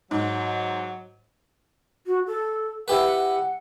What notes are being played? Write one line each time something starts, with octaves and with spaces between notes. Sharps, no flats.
G#2 F#3
F#4
A4
E4 G4 B4 F#5